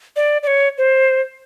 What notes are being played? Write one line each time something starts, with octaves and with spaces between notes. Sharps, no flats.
D5
D5
C#5
C5